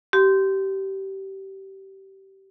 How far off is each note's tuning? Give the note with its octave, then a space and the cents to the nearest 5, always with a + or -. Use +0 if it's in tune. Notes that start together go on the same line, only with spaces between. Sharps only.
G4 -20 C6 -15